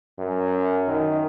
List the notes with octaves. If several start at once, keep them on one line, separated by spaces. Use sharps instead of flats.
F#2
D#3